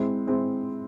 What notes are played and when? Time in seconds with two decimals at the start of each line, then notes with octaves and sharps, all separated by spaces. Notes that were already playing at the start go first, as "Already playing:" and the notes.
Already playing: G#3 C4 E4
0.27 G#3 C4 E4